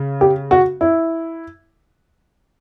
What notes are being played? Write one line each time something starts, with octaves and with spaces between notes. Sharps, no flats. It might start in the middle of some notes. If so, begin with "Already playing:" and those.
Already playing: C#3
G4
F#4
E4